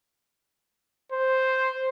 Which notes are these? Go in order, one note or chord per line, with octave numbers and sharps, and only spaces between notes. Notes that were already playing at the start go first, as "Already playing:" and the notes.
C5